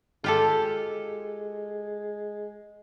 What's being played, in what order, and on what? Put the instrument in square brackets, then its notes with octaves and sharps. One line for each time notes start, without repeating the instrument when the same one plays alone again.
[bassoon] G#3 [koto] F4 G4 A4